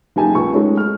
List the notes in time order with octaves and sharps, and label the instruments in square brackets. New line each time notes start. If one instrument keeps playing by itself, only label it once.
[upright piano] F#1 D#4 G4 G#5 A5
C#2 C#6
G#3 A3 C#4 D#4
F6